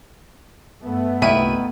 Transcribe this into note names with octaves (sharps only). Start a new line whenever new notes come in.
G2 A3 B3
C2 A#2 D#3 E4 D#7